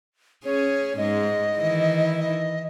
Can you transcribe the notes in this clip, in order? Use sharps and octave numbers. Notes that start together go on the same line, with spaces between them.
C#4 G#4 C#5
G#2 G#3 D#5
D#3 E3 E4
D#5